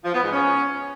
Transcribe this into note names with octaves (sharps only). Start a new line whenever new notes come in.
F3
B3
G#2
C#4